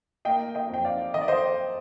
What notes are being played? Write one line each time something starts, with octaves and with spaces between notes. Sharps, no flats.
A#3 D#5 G5
D#5 G5
F2 G5
D5 F5
D#3 D#5
D5
C5 D#5